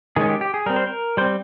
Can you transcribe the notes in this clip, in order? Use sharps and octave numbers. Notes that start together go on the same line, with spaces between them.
D#3 G#3 C#4 G#4
G4
G4
G#4
G3 C4 A#4
C5
A#4
G3 C4 C5